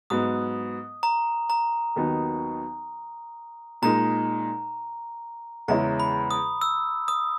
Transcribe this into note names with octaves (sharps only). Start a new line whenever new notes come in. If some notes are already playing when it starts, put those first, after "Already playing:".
G#2 F#3 B3 D#6
A#5
A#5
D#2 D#3 F#3 B3 D#4
A#2 G#3 D#4 A#4 A#5
E2 C#3 G#3 C#4 E4 A#5
B5
D#6
E6
D#6